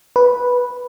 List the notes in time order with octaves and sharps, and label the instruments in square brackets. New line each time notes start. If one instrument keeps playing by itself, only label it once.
[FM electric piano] B4